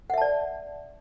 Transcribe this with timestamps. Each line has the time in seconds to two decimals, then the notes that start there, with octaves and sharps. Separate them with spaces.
0.10 F#5
0.14 E5
0.18 A5
0.22 D5